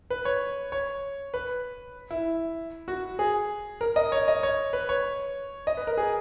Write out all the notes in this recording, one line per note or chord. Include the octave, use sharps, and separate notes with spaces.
B4
C#5
C#5
B4
E4
F#4
G#4
A#4
D#5
C#5
D#5
C#5
B4
C#5
D#5
B4
A#4
G#4